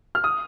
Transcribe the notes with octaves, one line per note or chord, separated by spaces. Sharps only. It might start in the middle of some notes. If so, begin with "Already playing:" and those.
F6
D#6